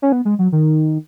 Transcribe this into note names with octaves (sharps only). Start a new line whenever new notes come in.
C#4
B3
G#3
F#3
D#3